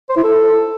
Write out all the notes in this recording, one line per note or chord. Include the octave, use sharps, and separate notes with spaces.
C5
E4
A4